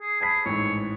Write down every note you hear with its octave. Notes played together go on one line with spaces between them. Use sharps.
G#4
G#4 A5 B5 B6
A1 G#2 C#5